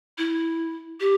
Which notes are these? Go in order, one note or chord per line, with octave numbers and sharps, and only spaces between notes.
E4
G4